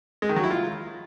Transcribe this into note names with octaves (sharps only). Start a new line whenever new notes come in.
G#3
D#3
F#3
E4
F4